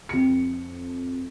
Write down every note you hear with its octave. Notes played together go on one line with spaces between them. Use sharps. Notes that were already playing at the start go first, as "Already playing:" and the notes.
F2 C#7